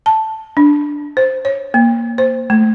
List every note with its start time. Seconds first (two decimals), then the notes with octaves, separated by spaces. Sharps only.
0.06 A5
0.57 D4
1.17 C5
1.45 C#5
1.74 A#3
2.18 C5
2.50 A3